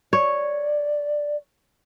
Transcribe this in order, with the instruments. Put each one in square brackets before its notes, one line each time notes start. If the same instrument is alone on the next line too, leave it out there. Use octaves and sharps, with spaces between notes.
[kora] C#5 [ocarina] D5